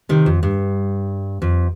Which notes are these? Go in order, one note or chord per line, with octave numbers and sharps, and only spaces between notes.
C3 D#3
F2
G2
F2